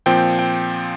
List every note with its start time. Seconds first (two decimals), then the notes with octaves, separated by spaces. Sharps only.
0.06 A#2 F3 C4 G5
0.39 G5